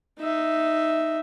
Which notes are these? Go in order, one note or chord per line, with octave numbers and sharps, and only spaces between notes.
D#4 E5